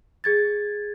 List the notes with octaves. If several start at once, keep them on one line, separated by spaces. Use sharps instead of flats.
G#4 G#6 A6